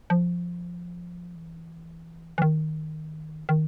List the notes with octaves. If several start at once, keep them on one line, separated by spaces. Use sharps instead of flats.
F3
E3
E3
D#3
D#3